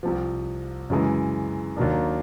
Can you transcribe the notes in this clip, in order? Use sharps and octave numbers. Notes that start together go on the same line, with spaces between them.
C2 C3 F3
F#2 C#3 E3 G#3
D#2 D#3 F#3 A#3 D4